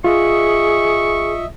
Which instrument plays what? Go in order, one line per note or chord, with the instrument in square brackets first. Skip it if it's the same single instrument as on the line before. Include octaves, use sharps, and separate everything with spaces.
[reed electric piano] F4 [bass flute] G#4 [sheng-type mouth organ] D#5 E5 [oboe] C#6